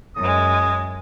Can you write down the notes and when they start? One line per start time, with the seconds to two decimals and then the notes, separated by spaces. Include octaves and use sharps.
0.16 F#2 G#3 D#6